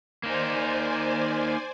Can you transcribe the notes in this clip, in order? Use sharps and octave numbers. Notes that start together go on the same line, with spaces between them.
A#3 D#4 C5 D5 G#5